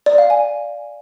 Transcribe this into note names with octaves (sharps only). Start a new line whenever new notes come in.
D5
F5
G#5